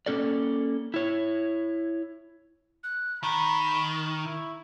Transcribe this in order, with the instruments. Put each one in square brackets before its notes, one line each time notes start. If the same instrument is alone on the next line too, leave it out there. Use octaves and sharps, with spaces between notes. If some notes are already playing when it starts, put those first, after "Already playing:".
[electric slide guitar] A#3 C#4 A4 D5
E4 C#5
[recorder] F#6
[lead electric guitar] D#3 [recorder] A#5 [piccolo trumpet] B5
[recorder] C#6
[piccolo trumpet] E4